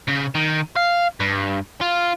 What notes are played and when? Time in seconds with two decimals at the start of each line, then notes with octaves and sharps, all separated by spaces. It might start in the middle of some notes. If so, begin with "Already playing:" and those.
0.08 C#3
0.35 D#3
0.76 F5
1.20 G2
1.81 F4